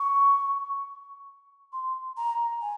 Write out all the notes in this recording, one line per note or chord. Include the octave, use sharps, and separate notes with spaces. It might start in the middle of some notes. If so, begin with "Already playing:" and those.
Already playing: C#6
C6
A#5
G#5